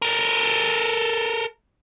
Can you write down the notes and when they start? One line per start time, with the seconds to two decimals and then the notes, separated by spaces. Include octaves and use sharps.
0.02 A4 A#4